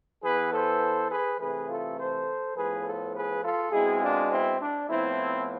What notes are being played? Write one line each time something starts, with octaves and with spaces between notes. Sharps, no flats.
E3 B3 G#4 B4
A4 C5
G#4 B4
C3 E3 A3 G#4 B4
F4 A4
A4 C5
A2 F3 B3 G#4 B4
F4 A4
G#4 B4
F4 A4
B2 G#3 C4 E4 G#4
D4 F4
C4 E4
D4
A2 F3 B3 C4 E4